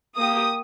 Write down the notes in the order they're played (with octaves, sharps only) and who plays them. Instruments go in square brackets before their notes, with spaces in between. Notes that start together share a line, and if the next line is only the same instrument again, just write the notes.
[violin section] A#3 G4 D#6